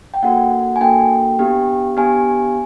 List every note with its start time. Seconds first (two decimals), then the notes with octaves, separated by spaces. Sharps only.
0.14 G5
0.23 A#3 D4 F#4 A4 F#5
0.76 G#5
0.81 A#3 D4 F#4 A4 G5
1.39 B3 D4 G4
1.97 B3 D4 G4 G#5